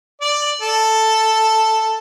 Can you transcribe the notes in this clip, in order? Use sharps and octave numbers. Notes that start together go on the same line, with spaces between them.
D5
A4